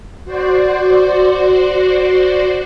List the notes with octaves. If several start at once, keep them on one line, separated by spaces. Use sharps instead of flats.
F#4 C5 D5